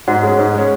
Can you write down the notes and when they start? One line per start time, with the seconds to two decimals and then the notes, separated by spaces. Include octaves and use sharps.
0.07 G#2 F#4 F#5
0.23 G#3 C#4
0.38 G#2
0.54 G#3 C#4